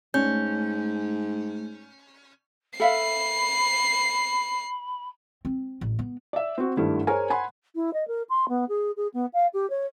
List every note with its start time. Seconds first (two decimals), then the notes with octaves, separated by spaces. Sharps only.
0.14 G#2 A3 C#4 G6
2.80 A4 E5 F5 B5 C7
5.45 C4
5.81 A1
5.99 B3
6.33 D5 E5
6.58 C4 F#4
6.77 G#1 G2 G3 A3 E4
7.07 G#4 A#4 C5 C#5 G#5
7.30 F#5 G#5 B5 C6
7.75 E4
7.94 D#5
8.08 A#4
8.30 C6
8.49 B3
8.69 G#4
8.97 G#4
9.14 B3
9.33 F5
9.54 G4
9.70 C#5